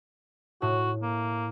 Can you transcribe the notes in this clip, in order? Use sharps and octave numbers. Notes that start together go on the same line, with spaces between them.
A2 F#4
A#3